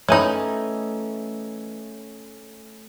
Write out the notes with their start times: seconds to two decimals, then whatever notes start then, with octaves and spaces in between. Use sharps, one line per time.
0.09 E3 A3 C#4 D#4 C#5 G#5 B5